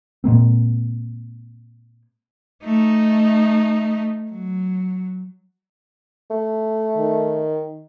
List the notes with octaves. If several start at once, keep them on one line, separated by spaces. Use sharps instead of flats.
A#2 G#3 A#3 C4
A3 D#4
F#3
A3
D#3